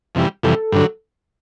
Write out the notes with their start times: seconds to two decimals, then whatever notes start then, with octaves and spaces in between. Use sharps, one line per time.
0.15 F2 C3 E3 G3
0.43 F2 C3 E3 G3 A4
0.72 G2 D3 F#3